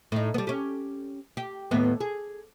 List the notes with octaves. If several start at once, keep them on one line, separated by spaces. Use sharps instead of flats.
A2 D#4
G3 B3
C#4 G4
G4
D#2 A2 B3
G#4